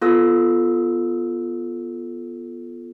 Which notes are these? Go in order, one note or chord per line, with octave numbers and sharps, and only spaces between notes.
B3 F4 A4 E6